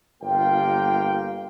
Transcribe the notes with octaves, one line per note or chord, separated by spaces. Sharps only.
G1 A#3 F4 G4 G5